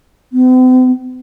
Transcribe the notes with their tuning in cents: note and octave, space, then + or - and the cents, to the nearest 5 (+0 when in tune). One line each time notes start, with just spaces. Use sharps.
C4 -45